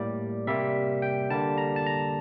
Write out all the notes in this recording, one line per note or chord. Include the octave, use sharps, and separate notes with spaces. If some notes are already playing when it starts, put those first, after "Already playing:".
Already playing: A2 G3 A#3 D5
C3 G3 A#3 E5
G5
D3 G3 A#3 A5
A#5
A5
A#5